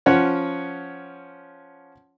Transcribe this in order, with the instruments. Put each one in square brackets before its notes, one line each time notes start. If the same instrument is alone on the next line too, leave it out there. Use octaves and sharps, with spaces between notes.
[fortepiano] F3 C#4 C#5 F#5